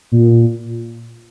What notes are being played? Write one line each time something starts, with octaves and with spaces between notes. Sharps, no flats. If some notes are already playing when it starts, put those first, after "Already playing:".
A#2